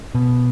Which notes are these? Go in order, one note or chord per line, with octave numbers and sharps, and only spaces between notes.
B2